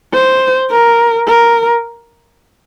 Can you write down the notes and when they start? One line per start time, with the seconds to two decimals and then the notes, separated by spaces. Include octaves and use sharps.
0.13 C5
0.71 A#4
1.27 A#4